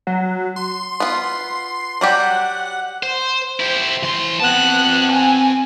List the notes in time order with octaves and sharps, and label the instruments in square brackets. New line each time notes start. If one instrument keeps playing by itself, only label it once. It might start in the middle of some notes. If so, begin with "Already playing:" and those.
[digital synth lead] F#3
C6
[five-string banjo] B3 F4
[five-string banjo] F#3 G3 G4 [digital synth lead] F#5
[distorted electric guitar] C5
[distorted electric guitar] E4 G4 [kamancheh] C5
[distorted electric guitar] E3 C6
[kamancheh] B3 F#6 [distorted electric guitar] C4 A5
[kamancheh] G#5